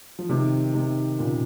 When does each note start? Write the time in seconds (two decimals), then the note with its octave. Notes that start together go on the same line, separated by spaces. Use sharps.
0.19 F3
0.29 C3 D#3
0.74 C3 D#3
1.19 A#2 C#3